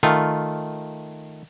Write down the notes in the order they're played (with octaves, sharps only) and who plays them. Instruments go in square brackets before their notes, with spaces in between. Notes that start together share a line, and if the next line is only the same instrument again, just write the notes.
[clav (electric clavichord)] D#3 A3 F4